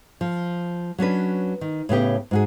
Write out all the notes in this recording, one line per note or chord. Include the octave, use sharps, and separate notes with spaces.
F3
F#3 C#4 D4 B4
D#3
A2 C#3 B3 G4
G#2 F#4 G#4